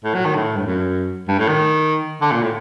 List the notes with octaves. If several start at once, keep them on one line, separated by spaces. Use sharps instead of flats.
A2
F#3
D#3
A2
G2
F#2
G2
A2
D#3
D3
A#2
A2